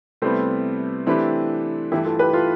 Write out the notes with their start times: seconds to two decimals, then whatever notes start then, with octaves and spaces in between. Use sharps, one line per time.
0.22 C3 G3 A3 B3 C4 E4 B4
1.06 E3 A3 C4 D4 E4 G4 B4
1.91 G2 E3 A3 E4 G4
2.05 F4 A4
2.19 G4 B4
2.33 F4 A4